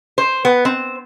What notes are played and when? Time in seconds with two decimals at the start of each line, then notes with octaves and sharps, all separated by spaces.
0.18 C5
0.45 B3
0.65 C4